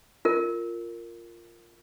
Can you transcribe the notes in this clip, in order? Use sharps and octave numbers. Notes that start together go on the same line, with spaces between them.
F4 A#4